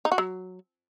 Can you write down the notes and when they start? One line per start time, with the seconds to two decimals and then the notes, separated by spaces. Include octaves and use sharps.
0.05 D#4
0.12 F#4
0.18 F#3